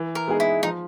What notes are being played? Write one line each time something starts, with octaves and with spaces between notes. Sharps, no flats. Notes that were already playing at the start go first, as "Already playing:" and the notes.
Already playing: E3
A#4
G#3 B3 D#4 G#4
E4
F3 D#4